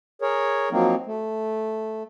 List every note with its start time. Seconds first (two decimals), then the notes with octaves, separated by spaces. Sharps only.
0.22 G#4 A#4 C#5
0.72 F3 F#3 A#3 C4 D#4
1.06 A3